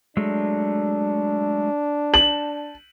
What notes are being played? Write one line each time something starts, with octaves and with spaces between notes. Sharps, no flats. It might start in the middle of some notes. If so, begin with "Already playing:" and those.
F#3 G#3 A3 D4
A5 F#7